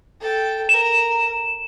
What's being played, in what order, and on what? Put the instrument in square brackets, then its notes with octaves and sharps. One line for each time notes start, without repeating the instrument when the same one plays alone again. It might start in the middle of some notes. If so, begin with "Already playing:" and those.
[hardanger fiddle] A4 G5
[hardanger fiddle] A#4 [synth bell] E7